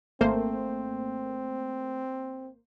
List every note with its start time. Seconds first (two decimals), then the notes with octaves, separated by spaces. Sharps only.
0.21 G#1 A3 A#3 C4 C5